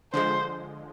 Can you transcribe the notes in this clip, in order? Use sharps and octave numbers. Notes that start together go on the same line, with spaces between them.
D3 F3 G#3 C5